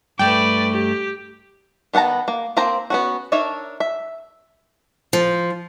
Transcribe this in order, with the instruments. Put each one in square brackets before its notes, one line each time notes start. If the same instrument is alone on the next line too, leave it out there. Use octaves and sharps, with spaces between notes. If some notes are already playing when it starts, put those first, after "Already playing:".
[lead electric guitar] G2 A3 [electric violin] B4 D5 [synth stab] G5
[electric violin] G4
[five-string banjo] D#3 B3 F#5 A5 A#5
A#3
A#3 C4 C5 A#5
B3 C#4 F#4
D4 D#4 A#4 C#5 E5
E5
[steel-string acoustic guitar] F3